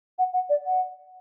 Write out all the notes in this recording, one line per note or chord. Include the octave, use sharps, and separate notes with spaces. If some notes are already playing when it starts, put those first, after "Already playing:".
F#5
F#5
D5
F#5